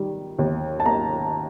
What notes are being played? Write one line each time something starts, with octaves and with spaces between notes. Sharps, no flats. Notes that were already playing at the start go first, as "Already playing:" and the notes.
Already playing: D#3 G3
D#2
A5
A#3 A#5